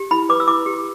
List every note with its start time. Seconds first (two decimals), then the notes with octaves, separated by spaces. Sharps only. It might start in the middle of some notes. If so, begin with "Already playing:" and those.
Already playing: G4
0.11 E4 B5
0.29 B4 D6
0.40 E6
0.47 E4 D6
0.66 G4